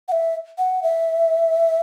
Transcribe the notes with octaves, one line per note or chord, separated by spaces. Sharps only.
F#5
E5
F#5
E5